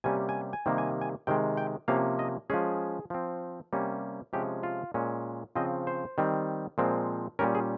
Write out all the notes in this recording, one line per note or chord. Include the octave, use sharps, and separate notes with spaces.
C3 G3 A#3 C#4 G#5
G#5
G#5
C3 D#3 G3 A#3
G#5
G#5
C3 D#3 G#3 G5
G5
C3 F3 A#3 C#4 F5
D#5
F3 G#3 C#4 G#4
F3 C4
C3 G3 A#3 C#4
C3 F3 G#3 C#4 G4
F4
A#2 G#3 C#4
C#3 F3 C4 D#5
C5
D#3 G3 C4
A#2 F3 G#3 C4
A#2 G3 C#4 A#4
G#4